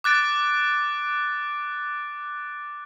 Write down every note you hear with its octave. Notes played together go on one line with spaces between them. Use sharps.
D6 F#6 A6 D7